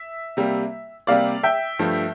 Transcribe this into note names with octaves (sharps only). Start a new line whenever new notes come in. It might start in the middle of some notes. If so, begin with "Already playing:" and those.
Already playing: E5
C3 G3 A#3
C3 G3 A#3 D5 F5
E5 G5
G2 F3 A3